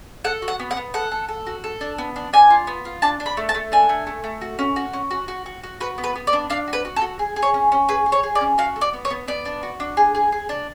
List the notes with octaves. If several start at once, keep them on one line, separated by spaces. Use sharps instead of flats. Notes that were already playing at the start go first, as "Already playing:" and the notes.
A4 F#5
F#4
F#5
B3
F#5
B3
A4 F#5
A4
A4
F#4
A4
D4
B3
D4
D4 G#5
F4
B3
F4
D4 A5
D4
B5
A3
A5
A3
D4 G#5
A3
A3
A3
F#4
C#4
F#4
C#4
F#4
F#4
F#4
F#4
F#4 B4
B3
B4
B3
D5
D4
D4 F5
F#4
B4
F#4
A4
F#4
G#4
G#4
C#5
C#4
C#4
G#4 B4
G#4
C#5
G#4
D5
C#4
F#4 F5
A4
D5
B3
C#5
B3
B3 D5
D4
F#4
D4
G#4
G#4
G#4
D4